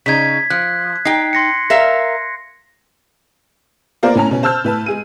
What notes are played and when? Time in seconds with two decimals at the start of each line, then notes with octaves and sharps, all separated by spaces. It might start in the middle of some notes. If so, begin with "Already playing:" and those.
0.06 C#3 D#4 G#6 B6
0.50 F3 F#6
1.05 D#4 G5 C7
1.33 C6 A#6 C#7
1.70 A#4 E5 F5 A#6
4.03 A#3 B3 F4 A#4 C5 D5
4.15 A2 C#4 A#5
4.31 B2 C#4
4.43 C5 A5 E6 F6 G6
4.64 A2 B4 A5
4.86 G#3 G#4 D#7